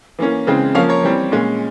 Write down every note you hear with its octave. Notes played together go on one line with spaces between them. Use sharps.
E3 A#3 C#4
C#3 E3 G#3 C4
F3 A#3 C#4 C#5 F5
A#4 C#5
E3 G3 C4
A#2 G#3 C#4